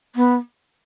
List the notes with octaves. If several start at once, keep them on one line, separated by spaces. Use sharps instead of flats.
B3